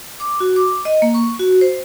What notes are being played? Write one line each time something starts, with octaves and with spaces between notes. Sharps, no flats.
D6
F#4
D6
D#5
A#3
C#6
F#4
C5